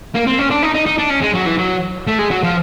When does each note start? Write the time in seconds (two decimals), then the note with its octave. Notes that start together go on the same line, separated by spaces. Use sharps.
0.14 A#3
0.27 C4
0.39 C#4
0.51 D4
0.63 D#4
0.75 D#4
0.86 D#4
0.99 D4
1.11 C#4
1.23 G#3
1.35 F#3
1.47 E3
1.59 F#3
2.07 A3
2.19 G#3
2.31 F#3
2.43 F3